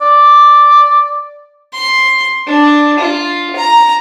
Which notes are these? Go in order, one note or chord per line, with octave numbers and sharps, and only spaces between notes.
D5
C6
D4
F4
A#5